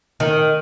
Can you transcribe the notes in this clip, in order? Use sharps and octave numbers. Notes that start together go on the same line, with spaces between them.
D#3